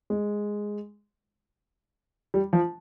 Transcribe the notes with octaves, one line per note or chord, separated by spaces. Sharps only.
G#3
G3
F3